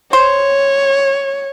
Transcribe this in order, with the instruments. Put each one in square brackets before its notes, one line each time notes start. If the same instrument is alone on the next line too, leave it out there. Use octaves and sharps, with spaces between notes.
[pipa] C5 [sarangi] C#5